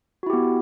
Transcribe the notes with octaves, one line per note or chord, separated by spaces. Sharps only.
B3 E4 F#4 G4